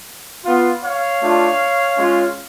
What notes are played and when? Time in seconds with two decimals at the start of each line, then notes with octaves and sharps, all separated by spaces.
0.45 B3 F4
0.83 C#5 F5
1.21 A3 D4 F4
1.97 G#3 C#4 F4